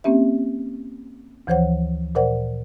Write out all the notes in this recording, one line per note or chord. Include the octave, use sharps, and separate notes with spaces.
A#3 C4 C#4 G4 E5
D2 E3 F3 C5 C#5 F#5
A#2 A#4 C5 D5 F#5